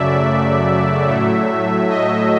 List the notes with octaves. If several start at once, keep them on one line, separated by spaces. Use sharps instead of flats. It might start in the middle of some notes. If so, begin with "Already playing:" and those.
Already playing: F#2 C#3 F#3 A3 D5 E5
A2 F#3 A3
D#5